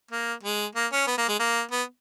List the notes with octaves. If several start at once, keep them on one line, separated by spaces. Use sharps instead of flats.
A#3
G#3
A#3
C#4
B3
A#3
G#3
A#3
B3